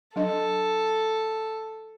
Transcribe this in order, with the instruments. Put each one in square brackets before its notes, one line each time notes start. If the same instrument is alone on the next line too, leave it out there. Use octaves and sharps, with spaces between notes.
[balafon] F#3 D4 D#5 [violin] A4